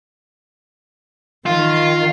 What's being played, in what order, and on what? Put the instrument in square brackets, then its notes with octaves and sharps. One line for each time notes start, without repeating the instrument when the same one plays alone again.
[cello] D#3 [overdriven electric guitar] F4